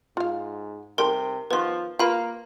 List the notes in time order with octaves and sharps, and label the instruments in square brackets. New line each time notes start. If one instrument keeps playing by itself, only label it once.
[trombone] G#2 [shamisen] F4 F5
[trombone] C3 [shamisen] G3 D#4 A4 [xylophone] A#4 G5 C6
[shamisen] D#3 B3 [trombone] F3 [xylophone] B4 C6
[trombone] A#3 [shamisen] F4 A#4 B4 [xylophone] F5 B5